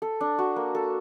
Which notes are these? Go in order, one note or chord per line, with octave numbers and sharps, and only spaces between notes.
A4
D4
F#4
A#3
A4